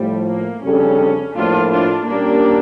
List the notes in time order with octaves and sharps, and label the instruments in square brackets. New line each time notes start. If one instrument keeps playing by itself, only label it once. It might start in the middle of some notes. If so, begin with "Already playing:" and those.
Already playing: [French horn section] A2 F3 A3 [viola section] G3
[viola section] A#3
[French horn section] F2 C#3 G3 D4 A4 [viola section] C#4
[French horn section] A2 F3 A#3 [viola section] D4 F4
[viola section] D4 F4
[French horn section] A#2 G3 C#4 G4 A#4 [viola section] A#3 D4